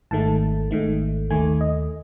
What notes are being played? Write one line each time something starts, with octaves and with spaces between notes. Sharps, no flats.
G#1 G#2 D#3 A3 A5
G#1 G#2 D#3 A3
D#2 D#3 A3 G#5
D#5